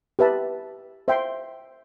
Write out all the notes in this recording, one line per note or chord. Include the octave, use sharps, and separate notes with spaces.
G4 B4 E5 A5
C5 E5 G5 C6